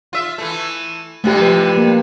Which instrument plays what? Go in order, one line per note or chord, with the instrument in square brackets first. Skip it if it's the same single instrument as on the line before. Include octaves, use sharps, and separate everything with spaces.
[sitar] F4 E5
E3 A3
[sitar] G2 C3 E3 [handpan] A3 G4
[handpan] F3 B4
A#3